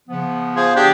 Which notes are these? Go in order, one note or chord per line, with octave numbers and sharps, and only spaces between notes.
C#3 F3 B3
F4 G#4 C5
D4 G4 G#4